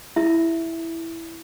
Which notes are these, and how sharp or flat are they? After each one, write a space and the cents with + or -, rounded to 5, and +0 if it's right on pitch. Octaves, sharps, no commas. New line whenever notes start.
E4 +0 E5 +0